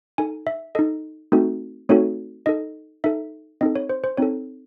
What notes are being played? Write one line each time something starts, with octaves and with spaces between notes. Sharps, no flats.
D#4 A4 G#5
E5
D#4 A4 D#5
A3 C4 D#4 F#4 A4
A3 C4 D#4 F#4 A4 C#5
D#4 A4 D#5
D#4 A4 E5
C4 D#4 A4 D#5
C#5
C5
C5
C4 D#4 A4 C#5